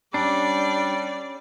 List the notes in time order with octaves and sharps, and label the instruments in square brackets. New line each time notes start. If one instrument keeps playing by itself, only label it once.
[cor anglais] G3 [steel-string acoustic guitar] C#4 [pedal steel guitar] D4 [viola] D5